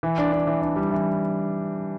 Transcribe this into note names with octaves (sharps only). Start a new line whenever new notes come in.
E3
D4
D4
E3
D4
G3
E3